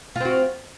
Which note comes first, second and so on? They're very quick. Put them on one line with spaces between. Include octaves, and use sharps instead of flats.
F4 C4 F#4